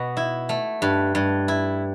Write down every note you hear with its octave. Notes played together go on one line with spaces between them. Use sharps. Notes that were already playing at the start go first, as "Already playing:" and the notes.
Already playing: B2 B3
E4
A3
G2
G2
E4